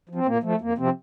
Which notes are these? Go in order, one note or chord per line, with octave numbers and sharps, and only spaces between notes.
F3
C4
A#2 A#3
F3 A3
F2 A#3
C3 F3 C4